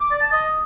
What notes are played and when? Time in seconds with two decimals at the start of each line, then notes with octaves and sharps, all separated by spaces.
0.01 D6
0.11 D5
0.21 A5
0.32 D#5